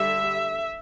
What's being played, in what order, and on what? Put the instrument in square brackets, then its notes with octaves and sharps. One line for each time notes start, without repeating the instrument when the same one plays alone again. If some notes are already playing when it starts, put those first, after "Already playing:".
Already playing: [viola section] D3 G3 E5